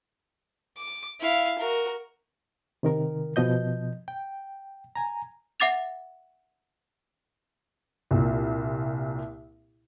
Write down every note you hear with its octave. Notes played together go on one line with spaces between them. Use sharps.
D6
E4 F5
F#4 A#4
C3 D#3 A#4
B2 F3 D#5 G6
G5
G#5 A#5
E5 F#5 D6 A6 F7
C2 A#2